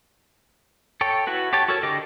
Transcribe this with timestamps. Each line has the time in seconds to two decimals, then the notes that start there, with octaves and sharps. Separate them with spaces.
1.01 A4 C#5 G5
1.27 E4 F#4 B4
1.53 G4 C#5 G5 A5
1.68 F#4 A4 A#4 C#5
1.83 D3 G4 D#5 G5 D6